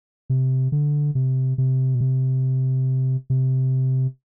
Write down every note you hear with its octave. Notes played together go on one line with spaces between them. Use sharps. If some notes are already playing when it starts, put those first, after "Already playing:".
C3
D3
C3
C3
B2
C3
C3